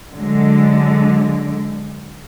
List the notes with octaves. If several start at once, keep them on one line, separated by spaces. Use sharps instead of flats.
D3 F#3 G#3